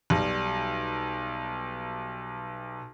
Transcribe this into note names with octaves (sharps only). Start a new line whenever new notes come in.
B1 G3